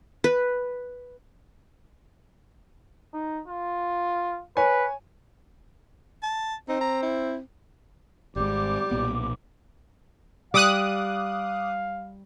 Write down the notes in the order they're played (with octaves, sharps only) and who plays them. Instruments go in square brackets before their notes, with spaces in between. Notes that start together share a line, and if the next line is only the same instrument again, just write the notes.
[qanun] B4
[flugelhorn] D#4
F4
[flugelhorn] B4 [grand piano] C#5 G#5
[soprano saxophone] A5
[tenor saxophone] C4 [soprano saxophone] D#4
[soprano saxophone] A#5
E4
[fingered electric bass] G#1 G#2 [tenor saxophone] G3 [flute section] D6
[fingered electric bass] B1 A#2 B3
[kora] G3 [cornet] F5 [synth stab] D6 D#6 F#6